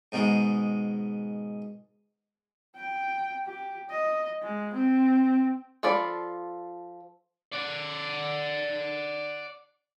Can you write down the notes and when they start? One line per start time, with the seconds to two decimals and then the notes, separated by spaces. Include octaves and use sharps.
0.12 G#2 B2 D#3 G#3
2.75 G5
3.46 G4
3.90 D#5
4.42 G#3
4.73 C4
5.83 F3 F4 A4 D5 B5
7.52 D5 F#5